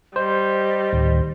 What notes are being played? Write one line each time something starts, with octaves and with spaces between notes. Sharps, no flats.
G3 C5 D#5
D2 A2 D#3